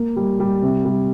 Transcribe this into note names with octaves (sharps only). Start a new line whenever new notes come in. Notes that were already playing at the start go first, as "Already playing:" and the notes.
Already playing: A#3
G3
G3
C3
G3